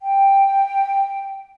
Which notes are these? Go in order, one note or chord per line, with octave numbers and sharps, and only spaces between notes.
G5